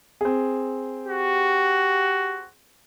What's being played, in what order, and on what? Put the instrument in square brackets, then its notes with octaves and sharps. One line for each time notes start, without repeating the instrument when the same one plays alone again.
[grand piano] C4 G#4
[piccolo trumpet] F#4 [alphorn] G4